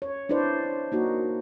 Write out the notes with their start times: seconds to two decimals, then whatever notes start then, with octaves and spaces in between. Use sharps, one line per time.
0.02 C#5
0.29 D4 E4 B4 C5 D5
0.92 A#3 D#4 F#4